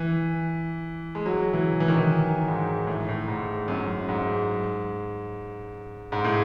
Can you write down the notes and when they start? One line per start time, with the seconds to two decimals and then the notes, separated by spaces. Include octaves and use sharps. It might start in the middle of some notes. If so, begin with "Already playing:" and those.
Already playing: E3
1.15 G#3
1.26 F#3
1.53 E3
1.80 E3
1.88 D#3
1.97 E3
2.48 G#2
2.87 A2
3.08 A2
3.28 G#2
3.68 F#2
4.09 G#2
6.12 G#2
6.24 A2